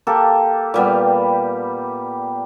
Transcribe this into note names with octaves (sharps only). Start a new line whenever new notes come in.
A#3 G4 A4
A#2 G3 B3